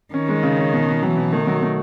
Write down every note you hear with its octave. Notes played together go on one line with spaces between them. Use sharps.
D#3 C#4
G#3
C#3
C#4
B2
B2
E3 F#3
B2
D#3 A3
F#3
A3